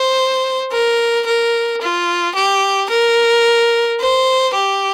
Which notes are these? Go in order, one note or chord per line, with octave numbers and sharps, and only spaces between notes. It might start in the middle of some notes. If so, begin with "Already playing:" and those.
Already playing: C5
A#4
A#4
F4
G4
A#4
C5
G4